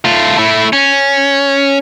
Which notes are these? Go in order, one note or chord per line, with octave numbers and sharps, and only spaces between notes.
A3 F4
A3 E4
C#4